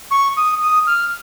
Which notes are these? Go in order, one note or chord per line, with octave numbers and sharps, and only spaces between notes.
C#6
D#6
D#6
F6